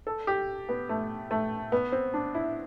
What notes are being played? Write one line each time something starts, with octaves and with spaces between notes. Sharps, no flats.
A4
G4
B3
A3
A3
B3
C4
D4
E4